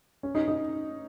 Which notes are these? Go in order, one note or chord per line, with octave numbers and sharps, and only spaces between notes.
C#4
D#4
D#4